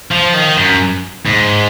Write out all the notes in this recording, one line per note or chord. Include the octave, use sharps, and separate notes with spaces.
F3
D#3
F#2
G#2